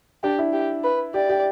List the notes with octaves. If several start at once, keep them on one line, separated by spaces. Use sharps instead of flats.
D4 G4
E4
G4
B4
G4 D5
G4